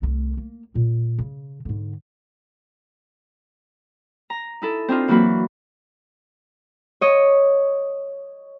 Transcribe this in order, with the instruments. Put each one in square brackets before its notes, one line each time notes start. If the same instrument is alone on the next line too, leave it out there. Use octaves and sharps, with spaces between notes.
[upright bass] C2 A3
A#3
A#2 G#3
C#3
G#2 D3
[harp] A#5
D#4 E4 A4
C4 D4 D#4 F4
E3 F#3 A#3 F#4 B5
C#5 D#5